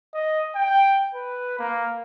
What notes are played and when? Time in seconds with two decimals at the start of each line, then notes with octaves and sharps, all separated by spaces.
0.14 D#5
0.55 G5
1.15 B4
1.59 A#3